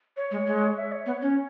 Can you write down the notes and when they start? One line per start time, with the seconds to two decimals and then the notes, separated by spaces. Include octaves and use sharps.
0.17 C#5
0.31 G#3
0.47 G#3
0.77 E5
0.92 C#5
1.06 B3 C#5
1.21 C#4 C#5